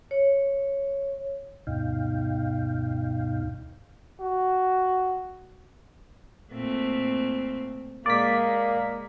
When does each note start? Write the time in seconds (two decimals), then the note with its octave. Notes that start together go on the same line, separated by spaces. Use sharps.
0.11 C#5
1.67 D2 G2 B2 D#4 F5 G5
4.20 F#4
6.52 A#2 A3 C4
8.06 A#2 G#3 A#3 D5 B6